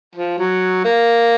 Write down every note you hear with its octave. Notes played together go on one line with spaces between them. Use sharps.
F3
F#3
A#3